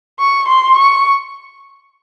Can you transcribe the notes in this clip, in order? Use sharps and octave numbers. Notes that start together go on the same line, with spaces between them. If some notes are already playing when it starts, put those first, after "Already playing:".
C#6
C6
C#6